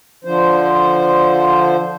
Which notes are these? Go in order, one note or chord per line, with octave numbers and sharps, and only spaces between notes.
D3 F3 C5